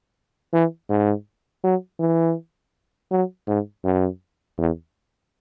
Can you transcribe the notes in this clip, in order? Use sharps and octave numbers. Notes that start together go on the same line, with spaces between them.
E3
G#2
F#3
E3
F#3
G#2
F#2
E2